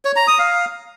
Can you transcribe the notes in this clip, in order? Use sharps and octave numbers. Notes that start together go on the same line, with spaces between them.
C#5
A#5
D#6
F5